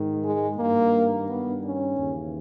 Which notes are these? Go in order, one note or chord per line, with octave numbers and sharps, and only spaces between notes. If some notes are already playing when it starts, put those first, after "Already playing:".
Already playing: G#2 D#3
G#3
G2 D#3 A#3
B3
C#4
D#2 C#3 E3